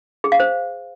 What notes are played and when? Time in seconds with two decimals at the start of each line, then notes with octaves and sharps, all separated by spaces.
0.24 G#4
0.32 F5
0.40 C5